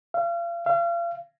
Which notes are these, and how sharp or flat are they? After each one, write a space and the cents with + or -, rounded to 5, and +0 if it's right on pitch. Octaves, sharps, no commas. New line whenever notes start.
F5 -35
F5 -35